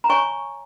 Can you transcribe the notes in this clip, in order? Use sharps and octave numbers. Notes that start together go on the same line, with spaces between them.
A#5
C#5 G#5 C#6